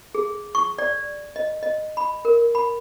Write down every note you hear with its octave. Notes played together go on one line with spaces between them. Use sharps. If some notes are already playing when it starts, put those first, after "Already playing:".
G#4
C#6
D5
D#5
D#5
B5
A#4
B5